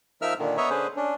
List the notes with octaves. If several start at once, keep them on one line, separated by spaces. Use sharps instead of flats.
F3 D#4 A#4 E5 E6 F6
A#2 D3 D#3
B3 C#5 D#5 E5 A#5
D3 C#4 G#4 B4 C5
C#4 D4